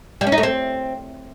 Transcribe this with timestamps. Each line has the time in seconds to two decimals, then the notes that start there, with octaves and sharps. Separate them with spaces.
0.21 G3
0.27 C#4
0.32 D#4
0.38 A3
0.43 C4